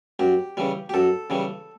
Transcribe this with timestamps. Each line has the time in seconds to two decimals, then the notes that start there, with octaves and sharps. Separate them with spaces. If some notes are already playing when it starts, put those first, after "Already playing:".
0.19 F#2 G4
0.57 C#3 E3 G3
0.89 G4
0.94 F#2 A4
1.30 C#3 E3 G3